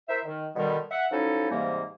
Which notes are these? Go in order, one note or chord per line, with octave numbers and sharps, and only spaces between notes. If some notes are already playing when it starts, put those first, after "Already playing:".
E4 A#4 C5 E5
D#3
B2 D3 D#3 G3
E5 F#5
F3 F#3 C#4 D#4 E4 A4
G#2 C3 E3 G3 A#3